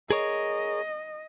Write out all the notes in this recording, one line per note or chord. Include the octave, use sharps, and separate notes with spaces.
G#4 A#4 C#5 D#5